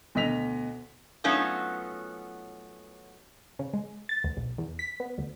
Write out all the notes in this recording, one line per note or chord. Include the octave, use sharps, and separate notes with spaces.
D2 B2 D#5 B6 F7
F#3 A3 B3 C#4 D#4 F4
C#3
G#3
A6
D2
B1
E2
B6
B3
D2